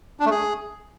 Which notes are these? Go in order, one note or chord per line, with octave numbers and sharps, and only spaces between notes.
D4
A3
G#4